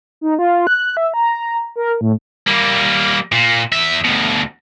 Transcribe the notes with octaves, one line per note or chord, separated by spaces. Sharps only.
D#4
F4
F#6
E5
A#5
A#4
A2
G3 A#3
A#2
E2 E5
D2 B2